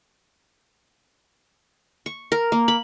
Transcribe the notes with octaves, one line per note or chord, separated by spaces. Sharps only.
C#6
A#4
A#3
B5